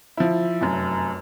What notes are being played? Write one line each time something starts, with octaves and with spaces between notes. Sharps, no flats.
F3 E4
F1 F#2